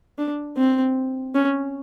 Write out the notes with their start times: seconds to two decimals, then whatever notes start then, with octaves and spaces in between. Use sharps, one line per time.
0.18 D4
0.57 C4
1.35 C#4